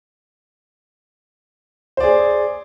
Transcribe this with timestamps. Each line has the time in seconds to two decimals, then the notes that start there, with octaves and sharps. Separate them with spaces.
1.97 C5
2.00 D5
2.03 G#4